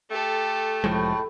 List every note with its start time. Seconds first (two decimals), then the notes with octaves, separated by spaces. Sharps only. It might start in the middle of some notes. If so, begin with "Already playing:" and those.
0.10 A3 G4 A4
0.84 F1 A2 F3 G#3